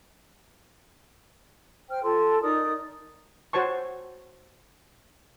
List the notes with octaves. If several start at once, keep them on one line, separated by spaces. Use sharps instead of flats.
C5 G5 F6
F4 A4 A5 C6
D#4 A#4 D5 D#6
F#4 C5 C#5 A5 C#6